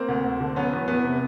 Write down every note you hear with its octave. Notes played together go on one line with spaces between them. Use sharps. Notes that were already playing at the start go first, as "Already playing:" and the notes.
Already playing: A#3 C4
D2
D2
D3
F#3 B3 C#4
E2 B3
E2 B3
C3